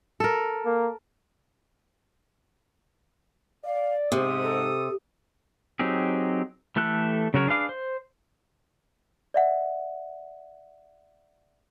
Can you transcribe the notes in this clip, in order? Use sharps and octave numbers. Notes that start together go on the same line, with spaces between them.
A4 A#4
A#3
D5 F5
G#2 C3 C5 D#6
A4
F#3 C4 D#4 G4 G#4
E3 A3 G4 A4 F#6
C#3 F#3 F#4 A#4 C#5
D4 G#4 B4 F5 D6
C5
D5 E5 F#5